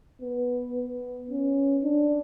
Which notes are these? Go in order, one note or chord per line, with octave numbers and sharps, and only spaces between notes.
B3
B3
C#4
D4